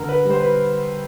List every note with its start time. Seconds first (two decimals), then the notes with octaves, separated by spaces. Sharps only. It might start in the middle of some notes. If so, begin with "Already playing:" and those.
Already playing: D3 A#4
0.09 B4
0.24 G3
0.31 C5
0.40 B4